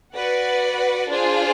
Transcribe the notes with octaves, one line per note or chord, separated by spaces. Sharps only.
F#4 B4 D5 F#5
D4 F4 G#4 C5